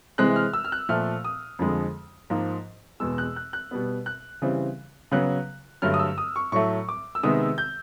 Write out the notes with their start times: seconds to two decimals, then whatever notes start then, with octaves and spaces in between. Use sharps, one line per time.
0.18 C3 E3 G#3 C4 F#6
0.36 F6
0.53 E6
0.65 F6
0.72 F#6
0.89 A#2 F3 A3 F6
1.25 D#6
1.59 F2 D3 F3 G#3
2.30 G#2 F3 A#3
3.00 E2 B2 G#3 E6
3.18 F#6
3.36 F#6
3.53 F#6
3.71 B2 G3 B3
4.06 F#6
4.42 C#3 E3 G3 C4
5.12 C#3 F#3 B3 F#6
5.82 G2 D3 F#3 A3 F6
5.94 D#6
5.99 E6
6.18 D#6
6.36 C#6
6.52 A2 F#3 A3 C#6
6.89 D6
7.15 E6
7.23 C3 D#3 G#3 B3 D#6
7.58 G6